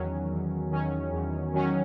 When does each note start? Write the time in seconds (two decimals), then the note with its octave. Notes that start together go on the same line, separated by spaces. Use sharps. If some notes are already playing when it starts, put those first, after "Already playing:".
Already playing: E2 D#3 F#3 C#4
0.30 E2
0.71 D#3 F#3 C#4
1.12 E2
1.53 D#3 F#3 C#4